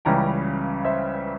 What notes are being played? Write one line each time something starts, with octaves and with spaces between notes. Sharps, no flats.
C#2 C#3 E3 G3 C#4 G5 A#5
C5 E5